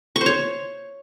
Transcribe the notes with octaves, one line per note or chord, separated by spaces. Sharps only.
C#6
C5
C#5